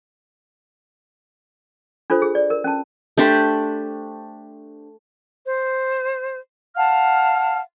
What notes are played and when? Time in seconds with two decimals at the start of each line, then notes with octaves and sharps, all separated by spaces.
2.10 D4 F4 A4 C5
2.22 G#4
2.35 D5
2.50 A#4
2.64 C#4 A5
3.17 A3 D4 G4 C5
5.46 C5
6.75 F5 F#5 A5 F6